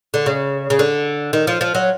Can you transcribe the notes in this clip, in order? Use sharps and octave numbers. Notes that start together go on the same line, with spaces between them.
D3
C#3
C#3
D3
D#3
F3
F3
F#3